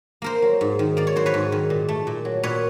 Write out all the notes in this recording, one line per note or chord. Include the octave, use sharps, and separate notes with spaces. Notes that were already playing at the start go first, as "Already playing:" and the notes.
A#3 A#4 C5
F#3
G#2
D#3
A#3 D5
C#5
F#3 C5
B4 C#5
G#2
D#3
A#2
A3
A#2
F#3
A#2 B4 C#5